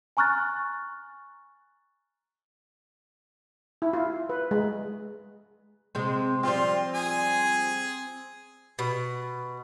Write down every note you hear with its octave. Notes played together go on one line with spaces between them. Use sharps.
G#5 A#5 C#6 F6 F#6 A6
E4
F4
B4
G#3
C3 G#3 C4 C5
F3 G3 C4 F4 C5
G#4 G#5
B2